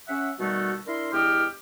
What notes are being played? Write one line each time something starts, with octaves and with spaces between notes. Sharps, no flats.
C#4 E5 F#5
B2 D#3 G3 A3 B3 F#4
D4 E4 A#4 C6
E2 G2 E4 G4 D#5 F6